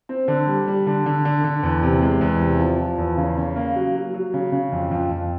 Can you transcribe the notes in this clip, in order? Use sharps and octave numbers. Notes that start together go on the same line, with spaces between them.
C4
D3
G3
G3
D3
D3
D3
D3
E2
C3
G#3
E2
C3
F3
F3
E2
C#3
C#3
A#3
F#3
F#3
F#3
C#3
C#3
F2
F2
F2